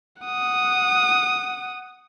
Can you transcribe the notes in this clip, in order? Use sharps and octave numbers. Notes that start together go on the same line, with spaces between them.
F#5 D#6